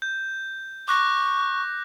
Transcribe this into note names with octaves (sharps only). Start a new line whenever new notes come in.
G6
C#6 D6 F#6 A#6